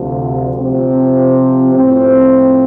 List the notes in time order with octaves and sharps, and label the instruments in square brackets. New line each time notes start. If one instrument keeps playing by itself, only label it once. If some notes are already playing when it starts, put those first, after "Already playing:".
Already playing: [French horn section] D2 C3 F3
C3 F3 C4 G4
A2 F3 C4